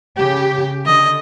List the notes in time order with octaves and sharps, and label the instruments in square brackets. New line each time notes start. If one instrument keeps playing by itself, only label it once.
[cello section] C#3 G4
[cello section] D3 [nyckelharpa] D#5